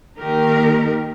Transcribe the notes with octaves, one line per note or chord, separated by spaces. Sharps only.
D#3 A#3 D#4 G4 A#4